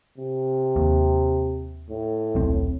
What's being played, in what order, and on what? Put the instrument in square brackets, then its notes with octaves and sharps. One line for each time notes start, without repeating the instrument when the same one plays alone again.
[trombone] C3
[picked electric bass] D#2
[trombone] A2
[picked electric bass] D#1 B1 C4